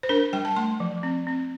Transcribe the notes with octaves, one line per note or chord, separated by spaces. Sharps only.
C5
D4 A#4
G3 G5
A5
A3 C6
F3
C4
C4